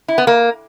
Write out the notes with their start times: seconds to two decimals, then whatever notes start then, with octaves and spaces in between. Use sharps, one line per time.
0.08 E4
0.18 B3
0.27 A#3